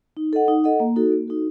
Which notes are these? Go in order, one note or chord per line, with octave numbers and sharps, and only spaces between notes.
D#4
A4 D#5 F#5
D#4
A4 D#5 F#5
A#3
D#4 F#4 A4
A#3
D#4 F#4 A4